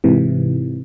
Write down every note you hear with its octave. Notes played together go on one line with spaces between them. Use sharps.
G#2 C3 E3